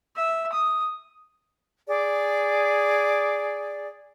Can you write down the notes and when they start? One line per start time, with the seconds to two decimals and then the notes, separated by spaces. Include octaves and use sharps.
0.16 E5
0.52 D#6
1.88 G#4 D5